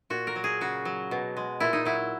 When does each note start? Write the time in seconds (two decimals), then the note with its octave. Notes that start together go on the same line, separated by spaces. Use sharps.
0.10 A#2 F#4
0.27 A#4
0.36 F#3
0.44 G#4
0.61 C#3 F#4
0.85 F#3
1.11 B2
1.37 G#3
1.60 A#2 E4
1.73 D#4
1.85 F#3 E4